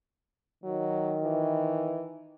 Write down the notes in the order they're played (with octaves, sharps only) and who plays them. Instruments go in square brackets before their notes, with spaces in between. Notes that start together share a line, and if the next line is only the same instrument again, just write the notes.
[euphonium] D#3 [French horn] F#3
[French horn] E3